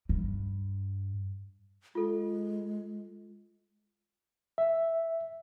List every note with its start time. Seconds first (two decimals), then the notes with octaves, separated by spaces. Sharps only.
0.09 G2
1.95 G#3 F4 A4
4.58 E5